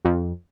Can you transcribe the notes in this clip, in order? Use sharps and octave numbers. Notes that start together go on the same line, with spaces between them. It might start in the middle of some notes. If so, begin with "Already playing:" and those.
F2